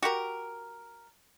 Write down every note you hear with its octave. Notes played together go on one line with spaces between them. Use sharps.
F#4 G4 A#4